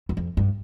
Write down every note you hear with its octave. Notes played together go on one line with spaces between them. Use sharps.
E2
F2
G2